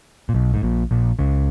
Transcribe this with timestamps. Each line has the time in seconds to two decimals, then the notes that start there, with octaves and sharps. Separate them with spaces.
0.29 A#2
0.34 B1 B2
0.54 G#2
0.63 A#1 A#2
0.91 A#1 A#2
1.19 C#2 C#3